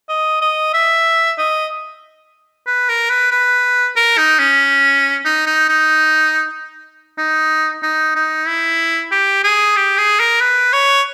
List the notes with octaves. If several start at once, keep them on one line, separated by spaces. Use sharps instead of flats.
D#5
D#5
E5
D#5
B4
A#4
B4
B4
A#4
D#4
C#4
D#4
D#4
D#4
D#4
D#4
D#4
E4
G4
G#4
G4
G#4
A#4
B4
C#5